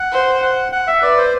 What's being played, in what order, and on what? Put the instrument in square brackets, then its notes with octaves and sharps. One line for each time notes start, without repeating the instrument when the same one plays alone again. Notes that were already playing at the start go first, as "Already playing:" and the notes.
Already playing: [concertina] F#5
[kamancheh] C5
[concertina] F#5
F#5
E5
[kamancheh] B4 [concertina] D5
[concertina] C5